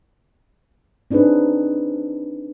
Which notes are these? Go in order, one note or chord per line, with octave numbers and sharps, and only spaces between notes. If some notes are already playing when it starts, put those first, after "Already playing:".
C4 D4 D#4 G#4 B4